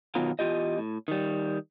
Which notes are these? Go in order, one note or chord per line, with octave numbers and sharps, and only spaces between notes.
B2 D#3 F#3 B3 F4 A#4
E2 G#3 F4 G4 D#5
A2
D#3 G3